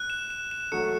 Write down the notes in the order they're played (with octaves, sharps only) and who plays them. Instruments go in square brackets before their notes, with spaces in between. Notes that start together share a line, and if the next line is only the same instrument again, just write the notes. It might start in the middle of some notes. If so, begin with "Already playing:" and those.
Already playing: [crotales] F#6
E7
E7
E7
[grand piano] F#3 A3 [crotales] C#7